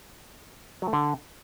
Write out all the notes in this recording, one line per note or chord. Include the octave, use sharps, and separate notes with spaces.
F#3
A3
D3